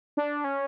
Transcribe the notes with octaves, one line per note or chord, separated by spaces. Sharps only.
D4
C#4